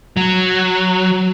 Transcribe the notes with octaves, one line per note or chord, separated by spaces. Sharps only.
F#3